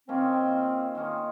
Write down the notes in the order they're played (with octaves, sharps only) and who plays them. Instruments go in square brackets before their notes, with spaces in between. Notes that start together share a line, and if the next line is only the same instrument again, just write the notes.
[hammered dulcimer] D#3 A#3 C#4 F4 [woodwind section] C4
[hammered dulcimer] D#3 A#3 C#4 F4